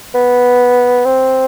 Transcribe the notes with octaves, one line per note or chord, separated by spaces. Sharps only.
B3
C4